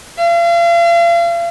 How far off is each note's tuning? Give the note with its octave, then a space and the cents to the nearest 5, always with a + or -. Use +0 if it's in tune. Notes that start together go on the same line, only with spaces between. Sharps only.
F5 -40